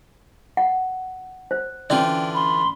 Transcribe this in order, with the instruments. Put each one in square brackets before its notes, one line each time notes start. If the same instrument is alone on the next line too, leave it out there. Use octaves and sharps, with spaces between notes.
[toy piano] F#5
C5
[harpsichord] D3 E3 F4 [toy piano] C#4 D5 [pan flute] G5
[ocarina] B5 [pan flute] C6